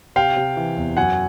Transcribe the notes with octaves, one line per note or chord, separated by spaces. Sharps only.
C3 F5 G5
C3
E3
E2
F#2 F#5 G#5